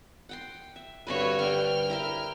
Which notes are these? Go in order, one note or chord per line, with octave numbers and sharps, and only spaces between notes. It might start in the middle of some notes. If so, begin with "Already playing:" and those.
F#5 G5 C6
E5
G2 D3 C4 F#4 B4 C#5
D3 G3 C4 G5 F6
E4 A#4 E5